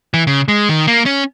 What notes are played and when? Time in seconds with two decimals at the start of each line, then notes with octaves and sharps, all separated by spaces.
0.14 E3
0.27 C#3
0.48 G#3
0.69 D#3
0.87 A#3
1.06 C#4